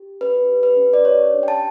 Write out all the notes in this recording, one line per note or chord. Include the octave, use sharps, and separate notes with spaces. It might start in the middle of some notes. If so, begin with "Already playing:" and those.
Already playing: G4
C#4 B4
G4
B4
C#4
D5
G4 C#5
D4
G5
A5